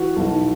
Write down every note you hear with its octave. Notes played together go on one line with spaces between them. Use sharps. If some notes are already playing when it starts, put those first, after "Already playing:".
Already playing: E3 F#4
B1